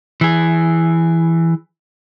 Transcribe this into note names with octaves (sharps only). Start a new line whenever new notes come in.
E3 G#4